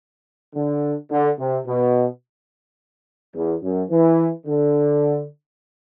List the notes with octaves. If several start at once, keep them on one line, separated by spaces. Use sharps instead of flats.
D3
D3
C3
B2
E2
F#2
E3
D3